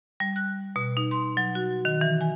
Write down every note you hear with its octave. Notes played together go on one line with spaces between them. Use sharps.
G3
F#6
B2
D#4
C6
F#3
F#4
D#3
E3
G#5